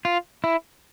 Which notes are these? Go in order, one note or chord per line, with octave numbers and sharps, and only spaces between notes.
F4
E4